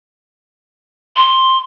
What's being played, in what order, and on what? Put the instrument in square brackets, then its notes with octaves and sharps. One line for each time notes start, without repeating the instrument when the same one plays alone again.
[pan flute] C6